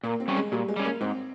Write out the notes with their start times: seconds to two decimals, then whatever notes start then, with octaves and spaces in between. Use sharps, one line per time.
0.04 A#2 A#3
0.20 C4
0.28 G3 C#4
0.36 G#3
0.52 A#2 G3
0.68 G#3
0.76 G3 C#4
0.85 A#3
1.01 G#2 C4